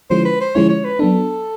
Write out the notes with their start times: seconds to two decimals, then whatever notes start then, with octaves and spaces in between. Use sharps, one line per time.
0.10 D3 F3 G#3 C#4 E4 C5
0.25 B4
0.41 C5
0.55 D3 F3 G#3 C#4 E4 C#5
0.69 C#5
0.85 B4
0.99 F#3 B3 D4 A4